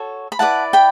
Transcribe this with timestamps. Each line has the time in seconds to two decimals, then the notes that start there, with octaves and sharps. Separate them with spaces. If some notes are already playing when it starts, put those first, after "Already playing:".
Already playing: F#4 A4 C#5
0.32 B5
0.39 E4 B4 D5 F#5 A5
0.73 G5 B5